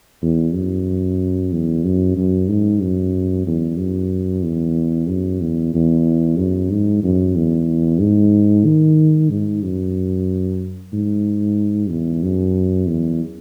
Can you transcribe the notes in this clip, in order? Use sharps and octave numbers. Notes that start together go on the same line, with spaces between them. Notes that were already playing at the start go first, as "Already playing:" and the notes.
E2
F#2
E2
F#2
F#2
G#2
F#2
E2
F#2
E2
F#2
E2
E2
F#2
G#2
F#2
E2
G#2
D#3
G#2
F#2
G#2
E2
F#2
E2